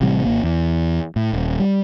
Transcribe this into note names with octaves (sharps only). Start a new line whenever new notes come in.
A1 C3 G3
G#1 C#2 A#3
E2
A2
D#1
G3